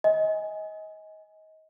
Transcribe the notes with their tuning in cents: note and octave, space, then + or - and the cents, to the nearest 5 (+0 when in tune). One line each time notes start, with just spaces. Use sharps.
D#5 +25 G#5 +0